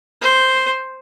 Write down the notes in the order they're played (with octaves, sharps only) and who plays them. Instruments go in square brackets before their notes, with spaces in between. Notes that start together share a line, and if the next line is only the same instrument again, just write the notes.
[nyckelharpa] C5